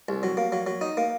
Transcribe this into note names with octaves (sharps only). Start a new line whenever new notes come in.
C2
F#3
A#3
F#3
F#3
D#4
A#3